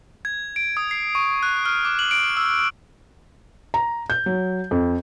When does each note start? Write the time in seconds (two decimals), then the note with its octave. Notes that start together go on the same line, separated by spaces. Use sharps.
0.25 G#6
0.56 D7
0.77 D#6
0.91 C7
1.15 C#6
1.43 F#6
1.66 F6
1.85 D6
1.99 F#7
2.11 D7
2.37 E6
3.74 A#5
4.10 G6
4.26 F#3
4.71 F2